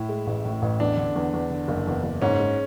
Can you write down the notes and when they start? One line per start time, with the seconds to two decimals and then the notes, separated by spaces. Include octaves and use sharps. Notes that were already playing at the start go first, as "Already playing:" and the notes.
Already playing: A2 E4
0.09 G#3
0.27 A1
0.44 A2
0.62 A1
0.80 E2 D4
0.97 D3
1.16 E2
1.33 E2
1.50 D3
1.68 F#1
1.87 E2
2.03 F#1
2.22 G#2 C#4
2.39 G#3